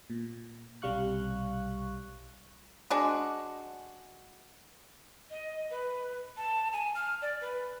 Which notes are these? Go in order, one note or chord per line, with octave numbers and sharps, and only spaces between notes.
A#2
B1 C3 G3 F5 C#6 F#6
G#3 D4 F#4
D#5
B4
A5
G#5
F6
D5
B4